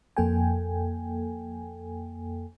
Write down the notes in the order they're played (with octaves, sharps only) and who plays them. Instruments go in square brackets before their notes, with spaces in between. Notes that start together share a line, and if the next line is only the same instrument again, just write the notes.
[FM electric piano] F2 A#3 A4 G5 G#5